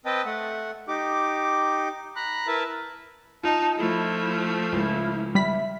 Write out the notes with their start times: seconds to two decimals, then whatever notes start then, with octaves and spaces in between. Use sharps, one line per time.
0.06 C4 B4 D#5 G5 A5
0.25 A3 F#5
0.88 D#4 G4 D6
2.16 A#5 B5 F#6
2.47 E4 A#4 B4 E5 A5
3.43 D#4 F4 A5
3.77 F3 A3 E4
4.72 C#2 E4
5.35 G3 E5 B5 B6